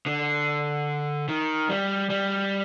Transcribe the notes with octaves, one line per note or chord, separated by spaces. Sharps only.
D3
D#3
G3
G3